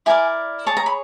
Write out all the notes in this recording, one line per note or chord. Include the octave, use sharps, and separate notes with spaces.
E4 G4 A#4 D5 G#5
G#4 C#5 A5
A#5
B5